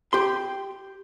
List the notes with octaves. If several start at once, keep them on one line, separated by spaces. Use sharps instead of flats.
G4 C6